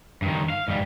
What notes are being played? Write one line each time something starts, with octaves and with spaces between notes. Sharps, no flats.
G2 D#3
F5
G#2 G3